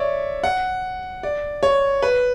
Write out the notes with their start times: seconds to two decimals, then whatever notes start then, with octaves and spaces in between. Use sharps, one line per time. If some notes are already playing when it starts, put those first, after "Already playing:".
Already playing: C#5 D5 E5
0.43 F#5
1.23 D5
1.63 C#5
2.02 B4